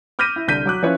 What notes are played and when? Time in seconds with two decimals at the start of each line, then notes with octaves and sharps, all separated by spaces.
0.19 D6 F6 G6 A#6 B6 D#7
0.36 E4
0.48 C2 D3 G6 B6 D#7
0.65 F#3 D6 F#6
0.83 F3 C#4 E4 B4 C#5